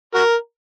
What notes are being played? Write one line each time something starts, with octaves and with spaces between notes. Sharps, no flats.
F#4 A#4